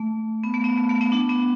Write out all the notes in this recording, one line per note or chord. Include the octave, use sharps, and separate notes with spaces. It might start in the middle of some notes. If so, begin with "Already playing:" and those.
Already playing: A3
B3
A3
B3
A3
A3
B3
D4
B3